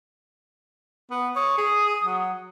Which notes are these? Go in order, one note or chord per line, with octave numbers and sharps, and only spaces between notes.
B3
C#5 D#6
G#4
F#3